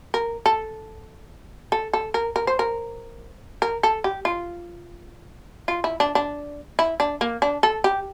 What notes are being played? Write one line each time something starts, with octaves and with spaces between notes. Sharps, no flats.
A#4
A4
A4
A4
A#4
A#4
C5
A#4
A#4
A4
G4
F4
F4
E4
D4
D4
E4
D4
A#3
D4
A4
G4